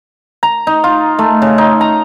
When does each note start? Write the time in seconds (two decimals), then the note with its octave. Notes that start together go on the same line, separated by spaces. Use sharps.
0.43 A#5
0.67 D#4
0.84 F4
1.19 A3
1.42 C#3
1.58 D#4
1.81 A#5